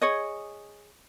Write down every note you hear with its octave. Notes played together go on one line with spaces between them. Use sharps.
G#4 C#5 D#5